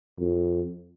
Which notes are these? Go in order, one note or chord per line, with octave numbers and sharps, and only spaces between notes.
F2